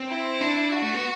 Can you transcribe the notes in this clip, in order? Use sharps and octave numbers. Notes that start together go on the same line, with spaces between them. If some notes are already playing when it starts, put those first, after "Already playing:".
Already playing: C4
E4
D4
F#4
A3
B3